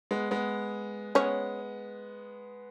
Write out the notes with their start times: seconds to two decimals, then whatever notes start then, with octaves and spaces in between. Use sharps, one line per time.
0.11 G#3 B3
0.31 G#3 B3
1.15 G#3 B3 C#4 C#5